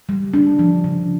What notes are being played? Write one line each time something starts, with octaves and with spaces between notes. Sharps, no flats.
G3
D4
F3
C#3